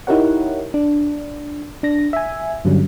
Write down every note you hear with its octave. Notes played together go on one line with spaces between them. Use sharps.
D#4 E4 G4 A#4 C#5 F#5
D4
D4 A#6
E5 G#5
G2 D3 F#3 G3 C#4